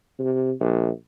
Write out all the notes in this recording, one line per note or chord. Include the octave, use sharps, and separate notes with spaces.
C3
A#1